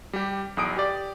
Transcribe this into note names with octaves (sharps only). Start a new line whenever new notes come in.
G3 G4
B1 E2 D#6 D7
G4 D5